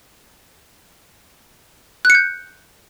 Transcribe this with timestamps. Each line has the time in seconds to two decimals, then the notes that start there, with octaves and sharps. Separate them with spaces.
2.05 F#6
2.10 C#7
2.15 G6